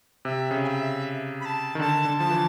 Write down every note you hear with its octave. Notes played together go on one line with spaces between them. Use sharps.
C3 E5
C#3
G#5
E5
B5
A5
D#3
D3 A5
D3
F3 A5
E3